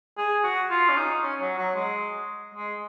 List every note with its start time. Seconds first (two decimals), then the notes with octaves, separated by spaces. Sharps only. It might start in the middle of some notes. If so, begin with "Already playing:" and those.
0.18 G#4
0.44 F#4
0.70 F4
0.89 C#4
0.97 D#4
1.23 C#4
1.41 F#3
1.58 F#3
1.75 G#3
2.55 G#3